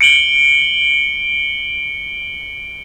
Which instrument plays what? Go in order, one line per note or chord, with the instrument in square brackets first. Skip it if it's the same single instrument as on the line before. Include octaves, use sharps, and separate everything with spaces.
[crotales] C#7 D7 F#7 G7